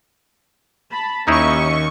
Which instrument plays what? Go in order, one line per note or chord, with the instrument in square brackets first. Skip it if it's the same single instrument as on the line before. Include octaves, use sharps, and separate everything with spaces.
[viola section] A5 B5
[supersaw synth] D#2 C#6 [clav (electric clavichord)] A#3 D#4 E4 [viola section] C#4 D#5 E5